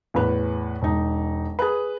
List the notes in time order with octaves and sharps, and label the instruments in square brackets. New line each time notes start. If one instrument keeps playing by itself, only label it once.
[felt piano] E2 A2 B4
E1 D#4
G#4 B4